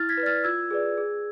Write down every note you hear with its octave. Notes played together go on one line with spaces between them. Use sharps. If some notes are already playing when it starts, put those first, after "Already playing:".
Already playing: E4 F6 A6
G#6 B6
B4
D5 F6 A6
F4 E6 G#6
G#4 B4 D5
G#4